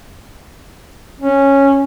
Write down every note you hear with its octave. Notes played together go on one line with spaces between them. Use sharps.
C#4